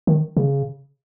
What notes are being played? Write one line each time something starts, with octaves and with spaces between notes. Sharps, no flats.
D#3
C#3